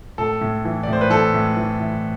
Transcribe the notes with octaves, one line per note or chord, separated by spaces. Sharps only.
A2 A4
A2
E3
D5
A2
C5
B4
E3 A4
A2
E3
E3